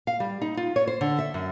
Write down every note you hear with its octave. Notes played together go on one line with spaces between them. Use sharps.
F5
G3
D#4
F4
C#5
C5
D3
E5
F#2